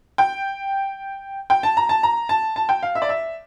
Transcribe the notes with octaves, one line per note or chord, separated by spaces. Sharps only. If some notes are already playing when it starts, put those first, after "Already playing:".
G5
G5
A5
A#5
A5
A#5
A5
A5
G5
F5
E5
D5
E5